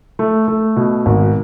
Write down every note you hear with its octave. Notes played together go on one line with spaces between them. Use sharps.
A3
A3
B2
G#1